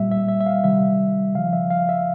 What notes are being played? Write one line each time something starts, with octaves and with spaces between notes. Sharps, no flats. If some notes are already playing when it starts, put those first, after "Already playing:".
Already playing: A#2 G3 E5
E5
E5
E5
F5
C3 D#3 G3 E5
C#3 F3 F5
E5
F5
E5